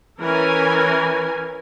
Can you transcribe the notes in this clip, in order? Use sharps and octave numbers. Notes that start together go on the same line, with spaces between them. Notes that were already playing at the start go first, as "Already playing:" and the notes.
E3 C#4 A#4 G#5